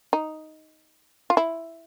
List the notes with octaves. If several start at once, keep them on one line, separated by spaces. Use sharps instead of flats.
D#4
F4
E4